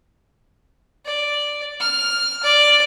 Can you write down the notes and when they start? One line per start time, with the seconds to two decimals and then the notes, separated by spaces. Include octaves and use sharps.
1.06 D5
1.80 F6
2.43 D5